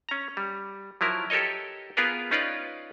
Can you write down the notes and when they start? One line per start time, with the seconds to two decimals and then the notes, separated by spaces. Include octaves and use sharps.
0.09 C#4 A#5
0.37 G3
1.01 F3 F#3 E4 A#4
1.30 G4 A4 A#4 C#5 D#5
1.97 B3 F4 G#4 A#4 B4
2.31 C#4 D#4 F4 B4 D5